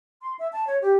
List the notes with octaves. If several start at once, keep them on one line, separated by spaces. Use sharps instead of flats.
C6
E5
A5
C#5
G4